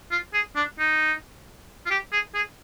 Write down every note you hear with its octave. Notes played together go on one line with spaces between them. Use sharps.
F4
G#4
D4
D#4
F4
G4
G#4
G#4